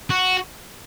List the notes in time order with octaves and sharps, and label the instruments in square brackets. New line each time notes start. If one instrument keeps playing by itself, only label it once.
[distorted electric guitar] F#4